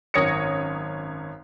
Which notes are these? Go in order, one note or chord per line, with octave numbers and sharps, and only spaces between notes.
G#1 F#2 C#5 D#6 A#6 C#7